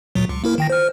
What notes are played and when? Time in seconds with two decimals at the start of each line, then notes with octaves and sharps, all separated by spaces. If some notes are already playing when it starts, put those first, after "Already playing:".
0.15 D2 A#2 F#3
0.29 C#2
0.44 A#3 E4 A#4
0.58 D#3 G5 A#6
0.70 C5 F6